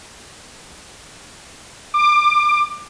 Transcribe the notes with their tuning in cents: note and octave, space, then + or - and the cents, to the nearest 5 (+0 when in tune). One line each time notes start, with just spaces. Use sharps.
D6 +25